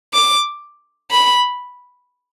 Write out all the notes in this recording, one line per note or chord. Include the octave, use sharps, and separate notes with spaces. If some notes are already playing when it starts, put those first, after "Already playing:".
D6
B5